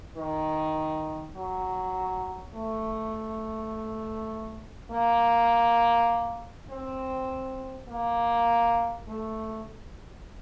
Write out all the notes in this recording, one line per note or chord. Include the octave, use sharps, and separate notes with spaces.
D#3
F#3
A3
A#3
C4
A#3
A3